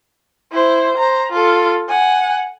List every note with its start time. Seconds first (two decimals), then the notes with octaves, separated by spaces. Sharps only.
0.52 E4 C5
0.97 C5 A#5
1.32 F4 A4
1.89 F#5 G#5